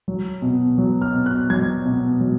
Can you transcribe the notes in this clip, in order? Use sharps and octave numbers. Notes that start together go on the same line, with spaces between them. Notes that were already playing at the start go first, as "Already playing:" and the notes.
F#3
B2
F#3
F6
B2
F#6
F#3 G#6
B2
F#3